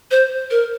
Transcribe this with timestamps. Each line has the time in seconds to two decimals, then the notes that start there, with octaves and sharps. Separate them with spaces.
0.11 C5
0.51 A#4